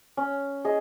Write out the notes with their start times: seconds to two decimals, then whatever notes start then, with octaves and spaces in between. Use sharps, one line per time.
0.17 C#4
0.65 G#4 D#5